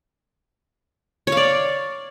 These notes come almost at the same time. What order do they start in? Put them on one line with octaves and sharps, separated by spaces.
C#5 F5 D5